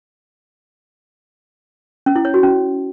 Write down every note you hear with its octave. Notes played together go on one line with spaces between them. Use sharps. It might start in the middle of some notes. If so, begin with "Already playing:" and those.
C#4
E4
C#5
F#4
C#4